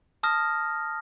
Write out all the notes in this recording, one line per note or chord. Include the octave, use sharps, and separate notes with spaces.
A5 D#6 F6 A#6